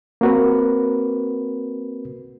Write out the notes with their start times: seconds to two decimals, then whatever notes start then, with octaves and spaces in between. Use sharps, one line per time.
0.21 A#3 C4 F#4 A#4 B4